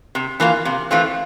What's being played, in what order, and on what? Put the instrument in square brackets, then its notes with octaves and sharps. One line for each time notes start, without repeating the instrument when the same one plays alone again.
[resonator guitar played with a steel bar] C3
E3 A#3 F4
C3
E3 A3 C4 F4